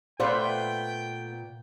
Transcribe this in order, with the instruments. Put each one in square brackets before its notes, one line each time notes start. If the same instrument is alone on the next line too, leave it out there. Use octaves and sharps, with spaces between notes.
[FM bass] A#2 [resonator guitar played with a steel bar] A3 B3 B4 [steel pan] C5 D5 F5 [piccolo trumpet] G5